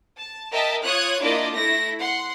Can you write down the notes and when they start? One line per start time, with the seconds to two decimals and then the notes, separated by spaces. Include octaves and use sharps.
0.18 A5
0.52 A#4 D#5 E5 G5 A5
0.85 F4 C#5 D#6 F#6 G#6
1.22 A#3 D4 E4 F4 D5 D#5
1.54 A3 E4 A#6
2.01 F#5 C6